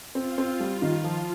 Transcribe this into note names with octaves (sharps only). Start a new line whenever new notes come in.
C4 F4
C4
G3
D#3
F3